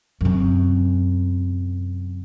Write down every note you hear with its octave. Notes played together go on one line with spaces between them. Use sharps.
F#2 C3